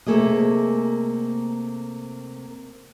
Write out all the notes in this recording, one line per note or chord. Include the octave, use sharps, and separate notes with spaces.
C3 A3 A#3 G#4 D#5